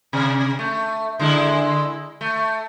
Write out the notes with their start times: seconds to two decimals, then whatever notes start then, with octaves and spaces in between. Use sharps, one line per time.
0.13 C3
0.59 A3
1.19 D3 G#3 E4
2.21 A3